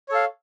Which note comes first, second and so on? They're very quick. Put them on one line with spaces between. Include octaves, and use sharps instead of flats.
C#5 A4 F5